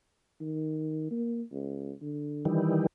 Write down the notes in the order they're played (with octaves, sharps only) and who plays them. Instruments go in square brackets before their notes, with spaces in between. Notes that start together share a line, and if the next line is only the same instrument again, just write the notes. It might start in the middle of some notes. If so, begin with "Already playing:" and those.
[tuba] D#3
A#3
C#2
D3
[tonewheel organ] D#3 E3 G3